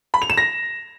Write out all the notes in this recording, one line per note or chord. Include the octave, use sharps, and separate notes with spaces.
B5
F7
E7
A#6